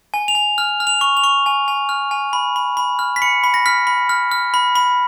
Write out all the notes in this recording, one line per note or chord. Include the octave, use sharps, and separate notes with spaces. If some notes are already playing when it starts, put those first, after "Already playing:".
G#5
F7
G#5
F6
F6
F7
C#6
F7
C#6
G#5
G#5
F6
G#5
B5
B5
B5
F6
B6
B5 C#7
B5
A#6
F6 B6
B5
F6
F6
B5
B5